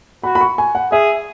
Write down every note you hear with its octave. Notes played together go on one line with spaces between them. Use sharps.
F#4 B5
B5
C#6
G#5
F#5
G#4 E5